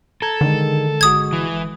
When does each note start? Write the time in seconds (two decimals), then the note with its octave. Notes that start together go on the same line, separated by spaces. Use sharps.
0.22 A4 A#5 G#6
0.41 D3 D#3 G#3
1.01 G1 G#3 F#4 D#6 G#6
1.33 E3